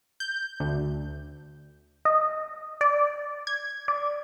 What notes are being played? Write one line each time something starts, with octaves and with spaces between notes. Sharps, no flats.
G6
D2
D#5
D5
G#6
D5